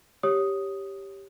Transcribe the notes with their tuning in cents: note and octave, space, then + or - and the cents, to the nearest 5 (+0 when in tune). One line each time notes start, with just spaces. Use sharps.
G4 +0 C#5 +0 D#6 +0